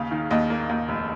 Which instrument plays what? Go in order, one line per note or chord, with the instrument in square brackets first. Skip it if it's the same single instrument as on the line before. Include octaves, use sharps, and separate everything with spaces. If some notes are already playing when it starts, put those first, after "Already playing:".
Already playing: [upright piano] D#2 C#3 F5
D#3
D#2 D#5
A#3
D#2
F1